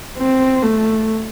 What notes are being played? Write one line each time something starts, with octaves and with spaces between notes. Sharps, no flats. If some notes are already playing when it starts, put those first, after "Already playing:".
C4
A3